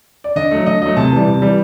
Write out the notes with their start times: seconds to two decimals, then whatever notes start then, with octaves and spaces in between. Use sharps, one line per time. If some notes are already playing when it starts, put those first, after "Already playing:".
0.24 D5
0.36 D3 D#5
0.51 F#3 A3
0.66 D3 D#5
0.82 F#3 A3 D#5
0.97 C3 A5
1.12 E3 G3
1.27 C3
1.42 E3 G3